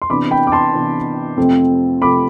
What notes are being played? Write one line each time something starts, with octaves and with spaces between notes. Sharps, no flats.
C6
C3 E3 B3 D4 B5 D6
G5 B5
D6
A5 C6
C3 E3 B3 D4
F2 C3 F3 A3 C4
C3 F3 A3 C4 B5 D6